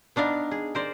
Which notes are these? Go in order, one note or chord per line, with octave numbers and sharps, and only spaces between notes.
B3 D4 D#4 F5
G#4
A#4 C5 D5